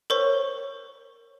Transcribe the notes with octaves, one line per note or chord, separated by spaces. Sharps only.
A#4 C5 C#5 C#6